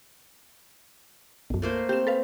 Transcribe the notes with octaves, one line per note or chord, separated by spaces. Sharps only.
B1 F#2
A3 A#3 C5
C4 G4 E7
A4 B4 F5